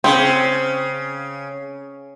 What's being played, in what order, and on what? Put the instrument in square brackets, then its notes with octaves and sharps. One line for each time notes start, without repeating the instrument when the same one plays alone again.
[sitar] C#3 [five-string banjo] C4